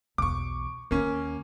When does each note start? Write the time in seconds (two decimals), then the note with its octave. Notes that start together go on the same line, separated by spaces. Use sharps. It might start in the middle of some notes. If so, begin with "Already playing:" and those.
0.18 B1 E2 C#6 D6
0.91 D#2 A#3 C#4